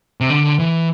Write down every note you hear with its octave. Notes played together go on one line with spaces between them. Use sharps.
C3
D3
E3